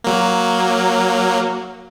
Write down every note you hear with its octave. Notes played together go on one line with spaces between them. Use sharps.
F#3 A#3